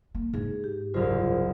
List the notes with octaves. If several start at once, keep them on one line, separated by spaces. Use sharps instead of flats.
A#3
G#2 G#4
G4
F#1 C2 F4 G#4 C5